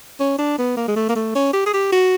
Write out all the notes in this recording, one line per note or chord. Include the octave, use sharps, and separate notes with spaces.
C#4
D4
B3
A#3
G#3
A3
A#3
A3
C#4
G4
G#4
G4
F#4